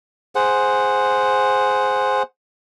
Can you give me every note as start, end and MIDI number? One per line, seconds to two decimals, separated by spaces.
0.35 2.23 68
0.35 2.23 72
0.35 2.23 78